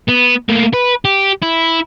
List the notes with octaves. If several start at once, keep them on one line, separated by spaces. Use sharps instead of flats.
B3
A3 A#3
B4
G4
E4